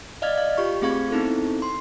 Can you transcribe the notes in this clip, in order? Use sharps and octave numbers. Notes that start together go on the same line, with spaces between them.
D5 D#5 F5 F6 G#6 A6
F5
F4 G4 C#6
A3 C4 G#4 F5 C#6 G#6
B3 C4 D#4 E4 A4
C6